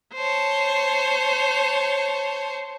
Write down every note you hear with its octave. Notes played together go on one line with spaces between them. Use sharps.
C5 C#5 A5